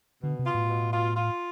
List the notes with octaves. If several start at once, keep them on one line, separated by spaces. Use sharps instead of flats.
B2 D3
C3
F4
A2
B2
F4
F4